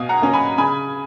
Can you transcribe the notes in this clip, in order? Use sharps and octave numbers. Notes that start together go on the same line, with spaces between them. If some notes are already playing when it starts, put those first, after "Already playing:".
Already playing: B2 F5 G#5
F#5 A#5
A#3 C#4
G#5 B5
C#3 G#5 B5